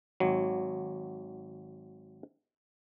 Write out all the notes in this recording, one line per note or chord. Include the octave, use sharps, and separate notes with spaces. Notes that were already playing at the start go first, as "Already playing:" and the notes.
G#1 F#3